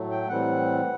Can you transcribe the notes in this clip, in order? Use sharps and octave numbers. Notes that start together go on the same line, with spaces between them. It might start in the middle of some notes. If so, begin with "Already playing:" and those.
Already playing: A2 F#3 A3
G5
A2 E3 G3 C4 F#5